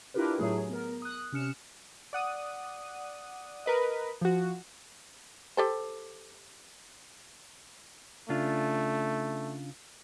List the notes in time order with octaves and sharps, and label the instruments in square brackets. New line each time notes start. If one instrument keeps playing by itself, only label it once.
[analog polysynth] D4 E4 F4 G4 A#4 B4
A2 F#3 A3 G#4
B3 A#4
D#6 F#6
C3 C#4 F6 C#7 E7
[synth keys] D5 F#5 D#6
A#4 B4 D#5
F3 F#4
[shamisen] G4 A4 C5
[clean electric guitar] C#3 D4 F4 [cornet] A3